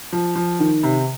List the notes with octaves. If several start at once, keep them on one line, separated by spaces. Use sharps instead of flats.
F3
F3
D#3
C3